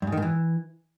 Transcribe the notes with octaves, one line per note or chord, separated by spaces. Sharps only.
G2
G#2
D#3
G#2
E3